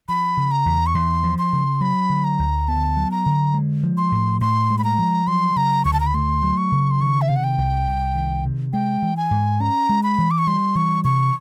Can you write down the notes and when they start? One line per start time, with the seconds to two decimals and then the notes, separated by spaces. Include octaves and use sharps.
0.08 F3 B5
0.37 C#3
0.51 A#5
0.66 E2
0.87 C#6
0.95 E2 C6
1.24 F3
1.39 C6
1.53 C#3
1.81 F#3 B5
2.10 D3
2.24 A#5
2.39 D2
2.68 B3 A5
2.97 F#3
3.11 A#5
3.26 D3
3.54 G#3
3.83 F3
3.97 C6
4.12 A2
4.41 A2 C6
4.70 G#3
4.78 B5
4.84 A#5
4.98 F3
5.27 F#3 C6
5.56 C#3 A#5
5.85 D2 C#6
5.93 A5
6.00 A#5
6.06 B5
6.14 A3 C6
6.43 F#3
6.57 C#6
6.72 C#3
6.91 C6
7.01 D#3 C#6
7.22 E5
7.28 C3 F5
7.36 F#5
7.44 G5
7.58 C2
7.87 C2
8.15 D#3
8.45 C3
8.73 G#3 G5
9.02 E3
9.17 G#5
9.31 G#2
9.60 C#4 A#5
9.89 G#3
10.03 B5
10.18 E3
10.31 D6
10.38 C#6
10.47 G3 C6
10.75 E3 C#6
11.04 C3 C#6